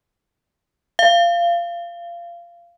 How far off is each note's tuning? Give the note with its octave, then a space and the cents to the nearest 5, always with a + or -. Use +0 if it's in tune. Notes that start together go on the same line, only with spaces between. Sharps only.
F5 -20